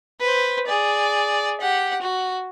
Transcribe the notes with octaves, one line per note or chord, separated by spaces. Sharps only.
B4 C5
G#4 D5
G4 F#5
F#4